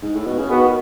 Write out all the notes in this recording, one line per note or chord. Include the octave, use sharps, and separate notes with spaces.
G#2
A2
B2
C#3
D#3 B3 F#4